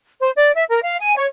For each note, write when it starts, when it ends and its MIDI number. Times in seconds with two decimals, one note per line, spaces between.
0.21 0.29 72
0.35 0.52 74
0.55 0.64 76
0.69 0.81 70
0.82 0.96 77
1.00 1.13 80
1.17 1.26 73